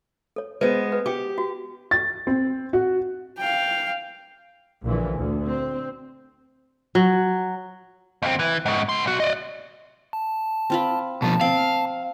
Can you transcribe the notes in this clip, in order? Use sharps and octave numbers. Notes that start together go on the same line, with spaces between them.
A4 C#5
G#3 B3 B4 C5
B4
G4 G5 D6
F#4
A6
C4
F#4
F5 G5
A#1 A#2 D3 E3
D2
C4
F#3
D#2 C4
E3
G#2 C#3
B3 C6
B1 F#4
D5 D#5
A5
C4 F4 B5
B2 F3 A5
C4 F5